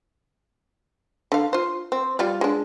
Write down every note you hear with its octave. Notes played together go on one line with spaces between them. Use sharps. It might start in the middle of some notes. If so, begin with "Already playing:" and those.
D3 F5
F4 C5
C4
G3 F4 D5
G#3 D4